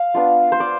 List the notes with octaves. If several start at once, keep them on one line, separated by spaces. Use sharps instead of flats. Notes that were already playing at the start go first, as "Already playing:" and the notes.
Already playing: F5
B3 D4 F4
C5
D5